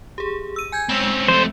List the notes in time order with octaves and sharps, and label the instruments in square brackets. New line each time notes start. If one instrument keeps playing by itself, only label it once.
[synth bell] G4 G#4
E6 D#7
G#5 G6 G#6
[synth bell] G#3 E6 [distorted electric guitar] C4 C#4
[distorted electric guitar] F2 A3 [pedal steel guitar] C5